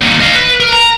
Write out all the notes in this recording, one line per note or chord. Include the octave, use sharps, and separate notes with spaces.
A#2 D#3
D#5 F5
B4
A#4
A#5